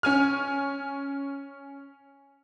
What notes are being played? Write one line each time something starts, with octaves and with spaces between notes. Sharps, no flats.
C#4 G#5 F6